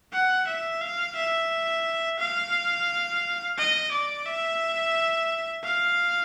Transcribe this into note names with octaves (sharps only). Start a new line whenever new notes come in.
F#5
E5
F5
E5
F5
D#5
D5
E5
F5